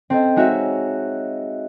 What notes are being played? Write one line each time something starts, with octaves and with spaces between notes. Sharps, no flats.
C4 A4 D#5
G#3 D#4 F#4 C#5 E5